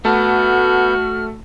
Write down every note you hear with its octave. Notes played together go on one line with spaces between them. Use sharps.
A3 B3 F#4 A5 F6 G6